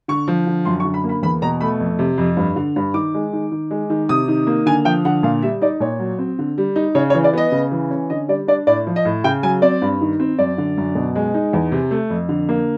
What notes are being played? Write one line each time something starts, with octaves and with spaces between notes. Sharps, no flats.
D3 C#6
F3
D3
F#2 C6
C#6
D3
B5
A#3
B5
E2 B5
B2 A#5
A3 B5
F2
C3
F2
G2
D3
G2
D#3 D6
G#3
D#3
D#3
G#3
D#3
C3 D#6
D#3
A#3
D3 G#5
F3 G5
D3 F#5
A#2 F5
G3 E5
D#4 D5
A#2 C#5
F#3
C4
D3
G3
D#4
C#3 C#5
C#5
E3
D5
B3 D#5
C#3
E3
C#4
D3 D#5
G3 D5
D4 D5
A2 D5
F3
D#5
A2
C#3 G5
F#3 G#5
C4 D5
G2
D#3
C4
F#2 D5
D3
F#2
B2
G#3
D#4
E2
C3
A3
F2
D3
A#3